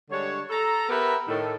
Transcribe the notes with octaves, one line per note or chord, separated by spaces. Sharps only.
D3 G3 G#3 D4 C#5
A4 A#5
B3 G4 A#4 B4 E5 A#5
A2 D#3 A4